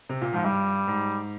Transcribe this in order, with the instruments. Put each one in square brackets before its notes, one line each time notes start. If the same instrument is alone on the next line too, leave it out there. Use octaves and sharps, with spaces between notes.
[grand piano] C3
A#2
[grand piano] G#2 [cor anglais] F3
[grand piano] G2 [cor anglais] G3
[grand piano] G#2